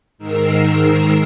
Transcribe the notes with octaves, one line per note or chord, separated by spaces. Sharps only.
G#2 D#3 A#4 E6 C7